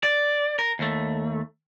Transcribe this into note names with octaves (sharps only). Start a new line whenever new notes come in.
D5
A#4
D#2 A3